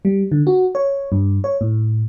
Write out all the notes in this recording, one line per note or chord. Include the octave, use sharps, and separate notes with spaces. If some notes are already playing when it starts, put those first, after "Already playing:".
G3
D3
F#4
C#5
G2
C#5
A2